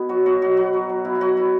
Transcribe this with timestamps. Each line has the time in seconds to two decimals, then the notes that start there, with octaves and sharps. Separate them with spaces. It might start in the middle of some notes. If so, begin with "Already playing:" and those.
Already playing: B2 B3 E4
0.09 F#3 F#4
0.26 B2 F#4
0.42 F#3 F#4
0.57 F#3 F#4
0.73 F#3
0.89 F#3
1.05 B2 E4
1.15 E4
1.21 F#3 F#4
1.36 F#3 E4